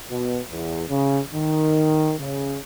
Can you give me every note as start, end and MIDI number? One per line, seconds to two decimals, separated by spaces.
0.11 0.39 47
0.52 0.84 40
0.89 1.20 49
1.34 2.15 51
2.19 2.58 49